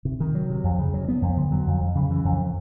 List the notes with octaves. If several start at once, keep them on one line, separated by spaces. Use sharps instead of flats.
C3
D#3
F#3
C3
F2
C#3
F#3
B3
F2
D3
F#3
F2
F2
C#3
E3
F2